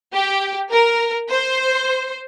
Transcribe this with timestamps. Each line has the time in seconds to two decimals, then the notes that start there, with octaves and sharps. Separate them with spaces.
0.13 G4
0.72 A#4
1.30 C5